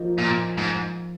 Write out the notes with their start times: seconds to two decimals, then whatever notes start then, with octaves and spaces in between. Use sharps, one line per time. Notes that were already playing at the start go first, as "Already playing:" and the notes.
Already playing: F3 A#3 D#4
0.18 A#2
0.57 G#2